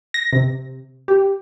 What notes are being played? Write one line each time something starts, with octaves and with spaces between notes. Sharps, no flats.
A#6
C3
G4